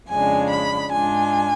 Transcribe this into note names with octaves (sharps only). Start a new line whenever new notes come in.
F2 C#3 G#3 D4 G#5
B5
G#2 G#3 D4 F4 G#5